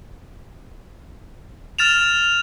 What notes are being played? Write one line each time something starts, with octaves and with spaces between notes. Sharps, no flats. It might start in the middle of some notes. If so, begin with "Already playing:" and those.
F6 A6 E7 F7